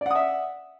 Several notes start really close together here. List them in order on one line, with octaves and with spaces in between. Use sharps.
D5 F#5 D#6 E5